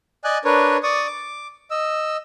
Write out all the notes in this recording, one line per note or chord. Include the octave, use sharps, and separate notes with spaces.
D5 D#5 G#5 F#6
D4 A#4 B4 C#5
D5 C#6 D#6
D6
D#5 E6